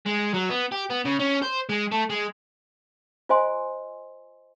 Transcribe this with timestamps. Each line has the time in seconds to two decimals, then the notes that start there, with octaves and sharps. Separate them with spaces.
0.06 G#3
0.34 F#3
0.50 B3
0.72 G4
0.90 B3
1.05 C#3
1.19 C#4
1.42 C5
1.69 G#3
1.92 A3
2.10 G#3
3.29 F4 C5 D#5 G#5 C6